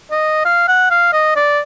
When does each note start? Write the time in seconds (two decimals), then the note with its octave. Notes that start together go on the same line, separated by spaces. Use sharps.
0.11 D#5
0.45 F5
0.68 F#5
0.91 F5
1.13 D#5
1.36 D5